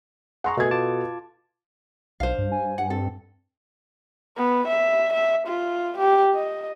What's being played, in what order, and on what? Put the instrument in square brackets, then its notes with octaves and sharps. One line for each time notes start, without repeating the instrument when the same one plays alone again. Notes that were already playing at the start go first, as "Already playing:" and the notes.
[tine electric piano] G#4 A#5 [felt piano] F#5 C6 C#6
[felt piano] B2 A4 G#6 [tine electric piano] A3 G#4
[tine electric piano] F4 A5 D6
[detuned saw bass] B1 [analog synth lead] D4 [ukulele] C5 F5
[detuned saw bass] G2
[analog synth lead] G#5
[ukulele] F#5
[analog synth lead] C4 [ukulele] A4
[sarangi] B3
E5
E5
F4
G4
D#5